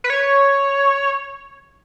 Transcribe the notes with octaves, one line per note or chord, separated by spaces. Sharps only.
B4
C#5